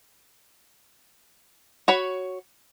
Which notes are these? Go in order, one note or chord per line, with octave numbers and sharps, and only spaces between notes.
F#4 C#5 B5